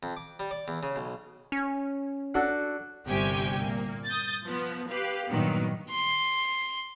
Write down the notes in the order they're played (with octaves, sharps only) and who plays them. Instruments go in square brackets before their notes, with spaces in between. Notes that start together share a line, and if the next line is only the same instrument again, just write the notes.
[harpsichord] F2
D6
G3
D5
E2
C#3
B1
[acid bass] C#4
[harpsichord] D4 F#4 A4
[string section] G1 C2 C3 G4 G5 G#5
A#2 A#3
D#6 G6 A6
F3 B3
G4 B4 F5
G2 A#2 D#3 F#3 B3
[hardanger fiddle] C6